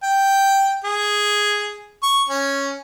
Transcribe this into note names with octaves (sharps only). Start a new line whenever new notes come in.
G5
G#4
C#6
C#4